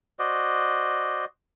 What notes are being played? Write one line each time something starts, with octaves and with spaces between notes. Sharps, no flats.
F#4 C5 D5 D#5